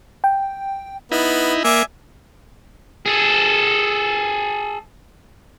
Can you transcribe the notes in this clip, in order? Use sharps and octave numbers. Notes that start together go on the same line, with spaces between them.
G5
B3 D#4 E4
A#3 D5 E5 G#5
G#4 A4